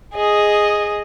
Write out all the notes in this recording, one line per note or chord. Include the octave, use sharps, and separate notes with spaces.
G#4 D#5